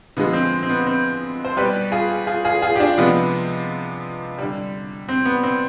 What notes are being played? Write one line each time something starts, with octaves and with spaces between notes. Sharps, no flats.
D3 F3 G#3 B3
C4
C4
B3
C4
C5
B2 G3 G4 B4
F4 G#4
F4 G#4
F4 G#4
F4 G#4
G4
D4 F4
C3 F3 G#3 B3
D3 G3
C4
B3
C4